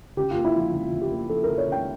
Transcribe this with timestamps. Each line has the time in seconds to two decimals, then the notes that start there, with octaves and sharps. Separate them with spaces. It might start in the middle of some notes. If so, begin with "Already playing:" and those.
0.17 C#3 G4
0.31 A#3 F4
0.45 E4
0.55 F3 F4
0.73 C#3 F4
0.92 C#3
1.01 G4
1.11 A#3
1.29 F3 A4
1.43 C#3 A#4
1.58 C#5
1.67 C#3 G5